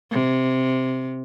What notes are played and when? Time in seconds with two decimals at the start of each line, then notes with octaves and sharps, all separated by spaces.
0.11 C3